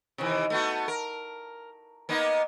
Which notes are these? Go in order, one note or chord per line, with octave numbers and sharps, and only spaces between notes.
C3 D#3 E3
A3 B3 F#4
A#4
A#3 B3 D#4